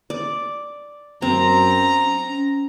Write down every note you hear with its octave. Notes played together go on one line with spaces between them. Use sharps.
D5
F#2 C4 A#5
C#4